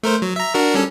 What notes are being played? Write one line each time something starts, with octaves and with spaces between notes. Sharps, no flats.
A3 A#4 C5
F#3
E5 A#5
D4 F#4 A#4
G3 C#4 A4